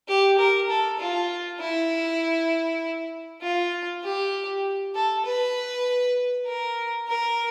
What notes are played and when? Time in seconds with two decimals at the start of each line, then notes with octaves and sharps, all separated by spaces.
0.08 G4
0.39 A#4
0.69 A4
0.99 F4
1.60 E4
3.42 F4
4.03 G4
4.95 A4
5.25 B4
6.46 A#4
7.07 A#4